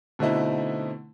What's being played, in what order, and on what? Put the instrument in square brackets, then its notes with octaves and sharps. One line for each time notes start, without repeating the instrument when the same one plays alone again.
[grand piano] B2 D3 A3 C4 D#4 E4